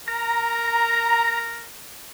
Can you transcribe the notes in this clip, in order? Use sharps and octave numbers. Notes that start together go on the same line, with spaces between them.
A#4 A#5